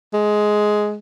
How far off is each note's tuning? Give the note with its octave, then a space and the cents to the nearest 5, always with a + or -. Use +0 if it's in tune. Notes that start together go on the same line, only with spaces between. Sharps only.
G#3 +10